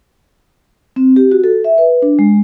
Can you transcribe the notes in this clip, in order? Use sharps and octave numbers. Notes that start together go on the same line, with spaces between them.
C4
G4
F#4
A4
E5
B4
D4
G#3